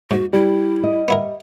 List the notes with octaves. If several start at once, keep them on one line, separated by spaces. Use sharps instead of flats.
G#2 F#4
G3 E4
D#5
B3 E4 A#4